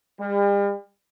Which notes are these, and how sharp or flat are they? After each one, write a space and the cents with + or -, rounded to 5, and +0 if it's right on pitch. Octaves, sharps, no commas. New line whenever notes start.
G3 +45